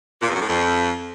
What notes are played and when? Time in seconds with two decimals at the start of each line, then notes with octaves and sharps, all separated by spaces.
0.21 A#2
0.28 E2
0.35 F#2
0.41 A2
0.48 F2